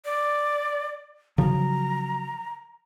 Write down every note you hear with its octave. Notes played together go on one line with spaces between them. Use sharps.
D5
C#3 F3 F#3 A#5